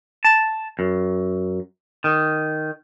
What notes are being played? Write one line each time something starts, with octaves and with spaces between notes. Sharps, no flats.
A5
F#2
D#3